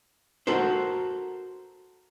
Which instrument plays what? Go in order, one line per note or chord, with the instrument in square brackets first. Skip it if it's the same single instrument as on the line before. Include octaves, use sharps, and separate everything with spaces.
[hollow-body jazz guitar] F#4 A4 A#4 C5